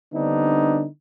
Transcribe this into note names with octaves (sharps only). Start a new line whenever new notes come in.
D3 G3 B3 C4 D4 D#4